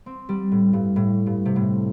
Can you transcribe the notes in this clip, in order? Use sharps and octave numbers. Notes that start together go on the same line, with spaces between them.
C4
G3
A2
G2
A2
G2
C3
A2